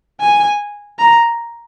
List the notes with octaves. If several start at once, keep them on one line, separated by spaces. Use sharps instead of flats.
G#5
A#5